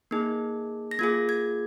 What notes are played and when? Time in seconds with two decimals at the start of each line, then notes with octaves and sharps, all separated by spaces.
0.11 A#3 D#4 G#4
0.91 A#6
0.99 A#3 F4 G#4 G#6
1.29 G#6